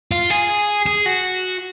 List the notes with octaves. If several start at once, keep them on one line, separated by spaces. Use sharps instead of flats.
F4
G#4
G#4
F#4